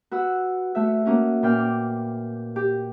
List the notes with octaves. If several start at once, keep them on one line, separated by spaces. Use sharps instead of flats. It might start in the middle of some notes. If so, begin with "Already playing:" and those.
F#4 B4 F#5 E6
A3 F#4 E5
A#3 C#4 F#4
A#2 B4 G5 F6
D6
G4